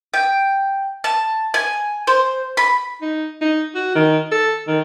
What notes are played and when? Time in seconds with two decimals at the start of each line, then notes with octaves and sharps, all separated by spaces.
0.14 G5
1.04 A5
1.54 G#5
2.07 C5
2.57 B5
3.02 D#4
3.41 D#4
3.75 F#4
3.95 D#3
4.32 A4
4.68 D#3